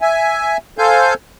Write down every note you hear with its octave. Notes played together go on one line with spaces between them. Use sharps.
E5 G#5
A4 C5 F5 G#5 G6